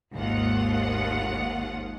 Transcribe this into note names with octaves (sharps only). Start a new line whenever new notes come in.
G#1 D#2 F4 F#5